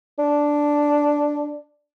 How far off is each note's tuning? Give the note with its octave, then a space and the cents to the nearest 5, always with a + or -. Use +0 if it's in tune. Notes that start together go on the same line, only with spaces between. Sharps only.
D4 -5